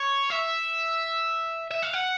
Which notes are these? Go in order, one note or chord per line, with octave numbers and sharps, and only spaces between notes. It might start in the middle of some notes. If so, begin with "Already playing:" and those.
Already playing: C#5
E5
E5
F5
F#5